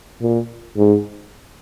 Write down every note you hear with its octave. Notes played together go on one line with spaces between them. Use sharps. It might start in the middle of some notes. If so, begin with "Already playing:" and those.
A#2
G#2